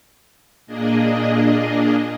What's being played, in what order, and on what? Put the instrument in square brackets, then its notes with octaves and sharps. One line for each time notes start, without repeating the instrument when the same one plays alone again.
[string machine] A#2 A#3 D4 G#4 D#5